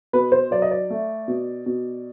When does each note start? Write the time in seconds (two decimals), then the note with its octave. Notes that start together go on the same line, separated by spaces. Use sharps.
0.13 B2 B4
0.32 C5
0.51 F#3 D5
0.62 D#5
0.71 D5
0.90 A3
1.28 B2
1.66 B2